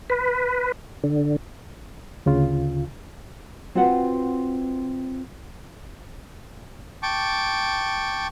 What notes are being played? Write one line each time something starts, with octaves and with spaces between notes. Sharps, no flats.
B4
D3
D2 C#3 F4
C4 F4 F#4 B4 F#5
G5 A5 C#6 D6